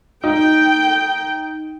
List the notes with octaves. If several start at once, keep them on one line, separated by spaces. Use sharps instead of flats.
D#4 G5